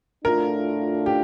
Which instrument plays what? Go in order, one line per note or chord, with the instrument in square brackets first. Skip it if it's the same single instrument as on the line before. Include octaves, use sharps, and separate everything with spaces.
[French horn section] A2 A3 D4 F4 [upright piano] A#4
[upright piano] G4